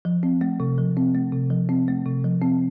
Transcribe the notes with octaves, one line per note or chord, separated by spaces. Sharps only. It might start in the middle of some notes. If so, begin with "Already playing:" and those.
F3
C4
A3
C3
F3
C4
A3
C3
F3
C4
A3
C3
F3
C4